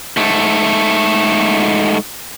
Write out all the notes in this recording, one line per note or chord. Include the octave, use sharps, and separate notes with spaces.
G#2 A3